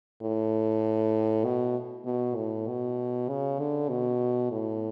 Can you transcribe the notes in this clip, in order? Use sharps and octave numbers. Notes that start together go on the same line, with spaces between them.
A2
B2
B2
A2
B2
C#3
D3
B2
A2